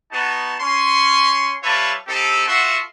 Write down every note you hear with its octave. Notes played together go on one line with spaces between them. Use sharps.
B3 D#4 F#4 A5
C#4 C6 C#6
G3 F4 B4 C#5 E5 A5
C4 D#4 G4 A4
F4 F#4 A4 E5 F#5 C6